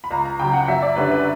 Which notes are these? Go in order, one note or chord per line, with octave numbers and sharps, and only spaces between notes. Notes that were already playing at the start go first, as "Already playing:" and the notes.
B5
C#2 A#5
A#5
C#3 F#3 G5
F#5
F#2 E5
D5
D3 G3 C#4 B4
B4